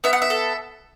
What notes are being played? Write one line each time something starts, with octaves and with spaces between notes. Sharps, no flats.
B3 E5
F#5
E5
A4